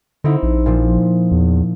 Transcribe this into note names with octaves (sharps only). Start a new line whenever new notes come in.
D3 C4 D#4 E4
A#1
A#2 F3
E2